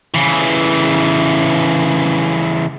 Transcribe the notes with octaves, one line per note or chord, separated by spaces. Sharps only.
C#3 E3